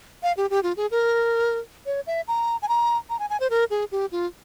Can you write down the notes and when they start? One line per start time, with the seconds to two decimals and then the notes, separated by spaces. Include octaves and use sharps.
0.23 F5
0.37 G4
0.50 G4
0.63 F4
0.77 G#4
0.91 A#4
1.86 C#5
2.07 E5
2.28 A#5
2.62 G#5
2.69 A#5
3.10 A#5
3.19 G#5
3.30 G#5
3.40 C5
3.50 A#4
3.70 G#4
3.92 G4
4.12 F4